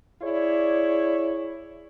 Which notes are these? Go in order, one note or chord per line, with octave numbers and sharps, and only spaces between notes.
E4 G#4 C#5 D5